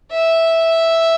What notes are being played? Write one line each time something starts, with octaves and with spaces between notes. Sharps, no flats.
E5